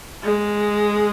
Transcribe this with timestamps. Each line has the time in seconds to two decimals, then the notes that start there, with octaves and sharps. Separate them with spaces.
0.23 G#3